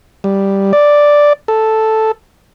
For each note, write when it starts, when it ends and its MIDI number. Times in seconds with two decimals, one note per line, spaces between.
0.24 0.73 55
0.73 1.33 74
1.48 2.12 69